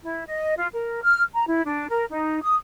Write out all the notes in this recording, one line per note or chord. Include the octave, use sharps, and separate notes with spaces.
E4
D#5
F4
A#4
F6
A#5
E4
D4
A#4
D#4
D#6